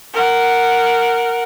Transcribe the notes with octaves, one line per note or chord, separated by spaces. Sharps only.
A#4 F#5